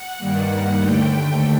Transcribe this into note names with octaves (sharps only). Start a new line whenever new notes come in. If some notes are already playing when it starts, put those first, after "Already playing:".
Already playing: F#5
G2 D#3 G3 A#3
F#5
D#2 D3 A3 G5